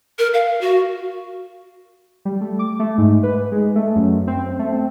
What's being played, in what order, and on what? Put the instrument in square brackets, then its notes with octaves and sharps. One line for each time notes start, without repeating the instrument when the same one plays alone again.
[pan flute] A#4
F5
F#4
[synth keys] G3
A3
D6
A3
G#2
B4
G#3
A3
F#2
C4
A3
C4